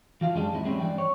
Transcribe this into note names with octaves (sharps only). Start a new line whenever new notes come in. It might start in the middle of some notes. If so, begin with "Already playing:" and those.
E3 F4 F5
F#2 G3 G#3 D4
F2 A2 E4
F3 G3 G#3 C4 C#4 E4
G2 E3 D5 G5
C#5